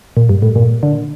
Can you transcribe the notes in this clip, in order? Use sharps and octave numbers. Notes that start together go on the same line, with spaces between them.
A#2
G2
A2
A#2
D3